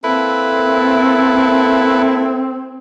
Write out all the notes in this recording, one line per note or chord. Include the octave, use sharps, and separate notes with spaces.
A#3 C4 E4 A4 B4